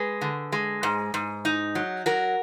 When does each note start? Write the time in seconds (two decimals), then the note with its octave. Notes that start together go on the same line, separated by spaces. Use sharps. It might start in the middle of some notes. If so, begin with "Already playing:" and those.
Already playing: G#3 G#4 B4
0.21 D3
0.52 G#3
0.83 G#2
1.14 G#2
1.45 D#4
1.75 F#3
2.06 F#3 F#4 A#4